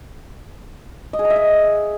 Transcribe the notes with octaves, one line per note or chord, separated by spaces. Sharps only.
D#5
G#4
A#5
E5
D#5